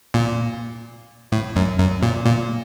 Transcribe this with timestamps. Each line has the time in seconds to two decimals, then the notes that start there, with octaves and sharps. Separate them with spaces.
0.14 A#2
1.32 A2
1.56 F#2
1.79 F#2
2.03 A#2
2.26 A#2